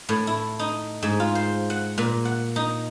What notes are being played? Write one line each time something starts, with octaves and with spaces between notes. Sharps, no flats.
A2
E4
D#4
G#2
F4
C5
F#5
A#2
F#5
D#4